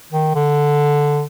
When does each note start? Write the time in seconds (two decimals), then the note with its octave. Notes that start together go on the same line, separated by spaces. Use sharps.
0.12 D#3
0.35 D3